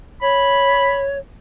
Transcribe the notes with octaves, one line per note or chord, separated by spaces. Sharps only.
C#5 B5